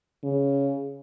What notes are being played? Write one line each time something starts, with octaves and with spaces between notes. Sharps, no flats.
C#3